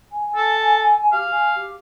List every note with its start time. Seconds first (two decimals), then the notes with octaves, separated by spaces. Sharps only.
0.12 G#5
0.36 A4
1.12 G4 F5
1.31 G#5
1.56 G4